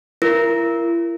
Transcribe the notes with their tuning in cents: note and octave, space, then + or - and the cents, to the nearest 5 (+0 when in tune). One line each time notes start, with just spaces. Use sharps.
E4 +40 A#4 +0